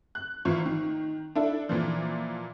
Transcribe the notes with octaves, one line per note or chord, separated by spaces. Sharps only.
F#6
G#1 E3 F4 C#6
D#3
D4 E4 A4
A#2 E3 F3